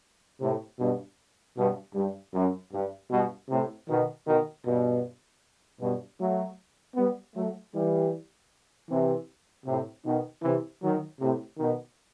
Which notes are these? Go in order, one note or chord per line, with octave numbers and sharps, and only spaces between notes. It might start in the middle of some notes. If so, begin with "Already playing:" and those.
A2 C3
G2 B2
G2 B2
G2
F#2
G2
G2 B2
A2 C3
B2 D#3
B2 D#3
G2 B2
G2 B2
F#3 A3
G3 B3
F#3 A3
E3 G3
C3 E3
A2 C3
B2 D#3
C3 E3
D#3 F#3
A2 C3
B2 D#3